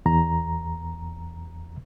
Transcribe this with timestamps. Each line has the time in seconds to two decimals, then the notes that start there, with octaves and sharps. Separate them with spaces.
0.06 E2 A#5